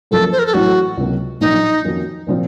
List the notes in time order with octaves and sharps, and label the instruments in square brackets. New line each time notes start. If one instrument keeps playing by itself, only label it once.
[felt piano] F#2 F3 A#3 [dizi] A4
[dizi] C5
A#4
A4
[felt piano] A1 A2 F#3 [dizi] F#4
[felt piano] C#2 C3 F#3 A#3
[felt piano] A#1 A#2 F#3 [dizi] D#4
[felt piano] F2 D#3 A#3 C#4 F#4
A#2 F3 C4 F4